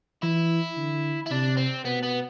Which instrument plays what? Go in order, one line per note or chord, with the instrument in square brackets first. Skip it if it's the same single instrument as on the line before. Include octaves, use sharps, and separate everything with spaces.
[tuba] E3 [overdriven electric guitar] E4
[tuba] D3
[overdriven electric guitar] E4
[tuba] C3 [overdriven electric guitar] D4
[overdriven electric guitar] C4
[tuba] B2 [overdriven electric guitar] B3
[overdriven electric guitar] B3